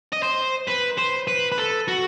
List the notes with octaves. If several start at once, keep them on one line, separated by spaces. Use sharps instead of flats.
D#5
C5
B4
C5
B4
B4
A4
F#4